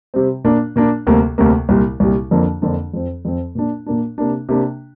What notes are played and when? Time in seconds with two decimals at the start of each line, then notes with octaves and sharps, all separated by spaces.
0.14 C3 G3 C4
0.44 A#2 A#3 D4
0.76 A#2 A#3 D4
1.07 D2 C3 G3 A#3
1.38 D2 C3 G3 A#3
1.69 C2 A#2 G3
2.00 C2 A#2 G3
2.31 F2 D3 F3 A#3 D4
2.62 F2 D3 F3 A#3 D4
2.93 F2 F3 C4
3.25 F2 F3 C4
3.55 A#2 A#3 D4
3.86 A#2 A#3 D4
4.18 C3 A#3 D4
4.49 C3 A#3 D4